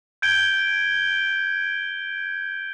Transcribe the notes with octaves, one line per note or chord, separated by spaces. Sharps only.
G6 G#6 D7 G7